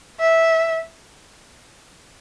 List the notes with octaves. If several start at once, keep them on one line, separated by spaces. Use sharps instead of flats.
E5